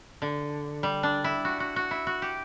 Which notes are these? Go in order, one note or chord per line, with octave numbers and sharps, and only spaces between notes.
D3
G3
D4
E4
F#4
F#4
F#4
E4
F#4
G4